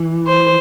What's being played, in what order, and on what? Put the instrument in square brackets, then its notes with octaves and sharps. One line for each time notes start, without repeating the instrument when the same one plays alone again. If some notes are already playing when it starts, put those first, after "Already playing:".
Already playing: [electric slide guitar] E3
[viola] C5